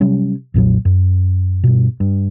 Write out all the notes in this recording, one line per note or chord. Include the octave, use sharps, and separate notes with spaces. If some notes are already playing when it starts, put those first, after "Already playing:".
C3 F#3 G3 C#4
B1 F2 A#2 F#3
F#2
G2 B2
G2